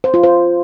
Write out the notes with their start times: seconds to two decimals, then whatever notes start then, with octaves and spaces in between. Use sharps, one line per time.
0.04 C5
0.14 F4
0.23 C5